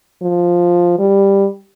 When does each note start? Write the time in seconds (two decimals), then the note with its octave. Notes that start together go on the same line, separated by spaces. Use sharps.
0.22 F3
0.99 G3